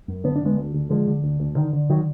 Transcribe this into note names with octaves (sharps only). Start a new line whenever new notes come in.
F#2
D3 B3
D4
D3 G#3 B3
D2
D2
D3 F3 G#3
D3
D2
D2
D3 D#3
D3
D#3 F#3